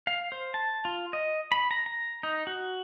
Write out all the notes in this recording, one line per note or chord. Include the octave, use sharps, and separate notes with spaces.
F5
C5
A5
F4
D#5
B5
A#5
A#5
D#4
F#4